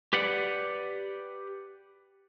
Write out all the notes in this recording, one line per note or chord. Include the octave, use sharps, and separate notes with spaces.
G4 B4 D5 F#5